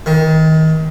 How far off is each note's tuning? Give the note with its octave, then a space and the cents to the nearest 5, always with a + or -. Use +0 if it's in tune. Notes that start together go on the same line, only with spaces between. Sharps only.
D#3 +30